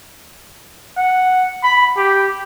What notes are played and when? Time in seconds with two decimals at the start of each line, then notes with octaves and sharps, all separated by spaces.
0.97 F#5
1.63 B5
1.97 G4